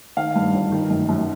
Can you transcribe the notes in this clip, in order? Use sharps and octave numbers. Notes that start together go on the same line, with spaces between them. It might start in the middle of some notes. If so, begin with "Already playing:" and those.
D#3 F5
G2
G1
D#3
F#2
F#2